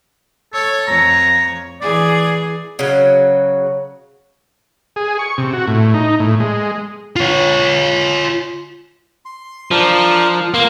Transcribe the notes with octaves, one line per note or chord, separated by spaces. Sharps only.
A4 C#5
F2 C#5 A#5
E3 G#4 D5
C#3 F#3
G#4
C#6
C3
F#4
A2
D#4
A2
G#3
F4 C#5
C6
F3 D4 A#4
A#3 A#4 C6